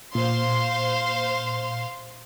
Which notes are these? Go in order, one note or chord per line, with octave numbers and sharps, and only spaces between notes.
A#2 C5 F5 C6